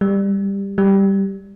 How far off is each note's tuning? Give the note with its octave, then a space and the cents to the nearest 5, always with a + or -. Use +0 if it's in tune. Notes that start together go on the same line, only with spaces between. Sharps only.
G3 +15
G3 +0